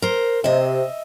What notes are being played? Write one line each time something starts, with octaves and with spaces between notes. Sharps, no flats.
A#4 C5
C3 D#5 E5